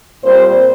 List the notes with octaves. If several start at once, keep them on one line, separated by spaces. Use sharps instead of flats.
A#2 G3 C4 C5